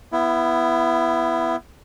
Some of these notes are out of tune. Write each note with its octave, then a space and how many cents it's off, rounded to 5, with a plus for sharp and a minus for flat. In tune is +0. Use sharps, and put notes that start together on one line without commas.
B3 +0 E4 +20